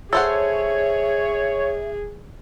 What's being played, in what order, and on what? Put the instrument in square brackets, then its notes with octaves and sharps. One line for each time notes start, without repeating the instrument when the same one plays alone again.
[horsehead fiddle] G#4 [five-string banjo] A4 C5 F#5 [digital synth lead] C#5 [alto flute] E5